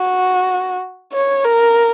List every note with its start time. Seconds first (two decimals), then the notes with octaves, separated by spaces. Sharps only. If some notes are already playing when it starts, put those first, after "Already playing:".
Already playing: F#4
1.13 C#5
1.44 A#4